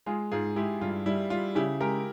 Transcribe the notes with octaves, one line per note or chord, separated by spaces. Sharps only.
G#3 F4 G#4
G#2 F4 G#4
G#3 E4 G4
G2 F4
G3 E4
G3 F4
C#3 E4 G4
G#3 G4 A#4